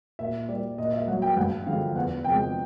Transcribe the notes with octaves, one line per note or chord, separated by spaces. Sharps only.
A#2 E5
G3 D5
A#2 D#5
E5
F#3 F#5
G5
G2 F#5
D3 F3 G#3 F5
E2 F#5
C3 F3 G#3 G5